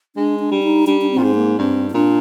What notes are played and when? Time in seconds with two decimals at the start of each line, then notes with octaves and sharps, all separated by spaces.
0.16 G#3 D4
0.40 D4
0.51 G3
0.63 D#4
0.87 G3 D4
1.01 D4
1.11 C4
1.18 A#2
1.23 G#2
1.35 A#3
1.58 G2 C4
1.90 D#4
1.94 A#2 D4